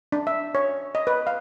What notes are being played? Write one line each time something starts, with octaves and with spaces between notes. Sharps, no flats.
D4
E5
C#5
D#5
B4
F5